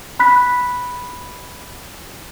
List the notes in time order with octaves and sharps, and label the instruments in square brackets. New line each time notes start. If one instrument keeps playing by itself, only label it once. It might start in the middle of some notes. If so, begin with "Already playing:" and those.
[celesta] B5 F#6 B6